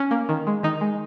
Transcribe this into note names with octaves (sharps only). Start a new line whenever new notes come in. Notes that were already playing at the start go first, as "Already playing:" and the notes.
Already playing: C#4
A#3
D#3
G#3
D#3 D#4
G#3